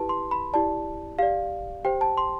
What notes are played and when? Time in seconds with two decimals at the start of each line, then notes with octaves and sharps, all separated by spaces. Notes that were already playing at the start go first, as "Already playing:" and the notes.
Already playing: E4 G4 B4 A5
0.09 C6
0.31 B5
0.53 E4 G4 D5 A5
1.19 G4 D5 F5
1.84 G4 C5 G5
2.01 A5
2.17 C6